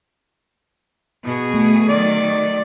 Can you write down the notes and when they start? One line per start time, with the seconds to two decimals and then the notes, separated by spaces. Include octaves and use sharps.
1.23 B2 G#4
1.54 A3
1.89 D#3 F#3 D5